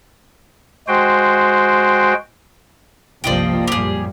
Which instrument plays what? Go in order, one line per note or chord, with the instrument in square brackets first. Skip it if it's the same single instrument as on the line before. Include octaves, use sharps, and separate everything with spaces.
[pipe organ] G#3 F#4 C5 G5
[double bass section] G1 C2 C3 [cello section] F3 A#3 [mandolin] D5 D#5 G5
[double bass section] F#2 A#2 G3 [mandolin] G4 G#4